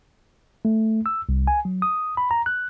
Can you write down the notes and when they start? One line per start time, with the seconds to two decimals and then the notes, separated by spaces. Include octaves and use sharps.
0.65 A3
1.06 E6
1.29 C2
1.47 G#5
1.65 F#3
1.82 D#6
2.17 B5
2.31 A#5
2.46 F#6